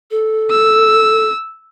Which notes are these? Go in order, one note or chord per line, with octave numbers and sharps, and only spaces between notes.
A4
E6